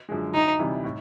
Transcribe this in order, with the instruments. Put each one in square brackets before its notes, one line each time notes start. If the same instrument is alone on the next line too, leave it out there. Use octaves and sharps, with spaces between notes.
[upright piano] F#2 D3 F3 G#3
[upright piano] D2 [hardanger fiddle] D#4
[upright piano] C3 E3 G3
A2